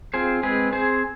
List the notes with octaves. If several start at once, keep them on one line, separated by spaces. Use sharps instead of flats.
C4 F4 G#4 C5
G#3 C4 G#4 B4
C4 G#4 C5